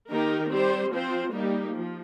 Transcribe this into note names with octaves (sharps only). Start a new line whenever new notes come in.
D#3 A#3 D#4 G4 A#4
G3 C4 G4 C5
F3 C4 F4 C5
G3 A#3 D#4 G4
F3